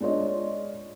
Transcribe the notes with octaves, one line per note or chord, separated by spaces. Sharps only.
G#3 D4 F4 C#5 D#5